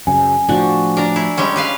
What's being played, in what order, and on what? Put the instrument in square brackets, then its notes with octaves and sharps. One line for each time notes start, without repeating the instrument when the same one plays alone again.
[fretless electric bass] F#2 C#3 [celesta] G#5
[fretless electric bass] A2 F3 [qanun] D4 F#4
[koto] D4 [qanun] A#4 A#5
[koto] E4
G3 G#3 C#4
G3 B4 F5